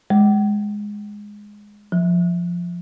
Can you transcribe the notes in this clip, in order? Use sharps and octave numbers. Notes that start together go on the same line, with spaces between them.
G#3
F3